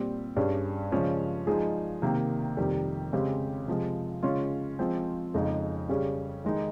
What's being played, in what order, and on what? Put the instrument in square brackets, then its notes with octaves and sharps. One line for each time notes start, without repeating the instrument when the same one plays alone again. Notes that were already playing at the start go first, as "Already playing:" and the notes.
Already playing: [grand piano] A#2 G3 C4
G2 G3 C#4 G#4
C#3 F3 G#3 C#4
F3 G#3 D#4 G#4
C3 D#3 A#3
F2 C3 D#3 G3
C#3 G#3 C4 G4
C3 F3 G#3
C#3 G#3 C#4 F4
F3 G#3 C4
F2 C#3 G#3 D#4 G#4
C#3 G3 C#4 G#4
D#3 G#3 D#4